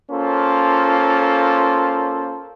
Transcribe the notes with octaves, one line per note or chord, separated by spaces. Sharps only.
A#3 C#4 F4 A4 C5